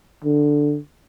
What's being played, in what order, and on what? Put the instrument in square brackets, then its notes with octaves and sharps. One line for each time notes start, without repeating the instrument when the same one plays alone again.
[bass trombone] D3